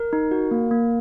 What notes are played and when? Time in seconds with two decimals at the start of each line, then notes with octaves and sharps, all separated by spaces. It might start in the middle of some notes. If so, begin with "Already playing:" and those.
Already playing: A#4
0.13 D#4
0.31 F#4
0.51 A#3
0.71 A#3